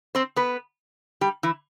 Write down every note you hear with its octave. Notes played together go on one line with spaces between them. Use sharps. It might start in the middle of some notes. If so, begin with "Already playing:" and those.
C4 C5
B3 B4
G3 G4
E3 E4